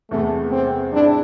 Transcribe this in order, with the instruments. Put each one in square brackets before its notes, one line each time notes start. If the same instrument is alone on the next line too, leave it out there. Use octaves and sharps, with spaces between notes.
[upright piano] E2 C3 G#3 B3 [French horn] A3
[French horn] C4
[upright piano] G#2 G#3 C4 E4 [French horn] D4